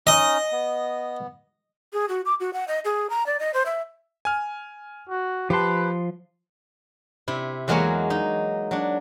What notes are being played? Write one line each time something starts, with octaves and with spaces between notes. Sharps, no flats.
C#4 D#4 D#5 D#6
B3
G#4
F#4
D6
F#4
F#5
D#5
G#4
A#5
D5
D#5
C5
E5
G#5 F6
F#4
F3 G4 B4 A5 C6
C3 E4
E2 F#3 G#3 A#3 A#4 C#5
D#4
F#3 D4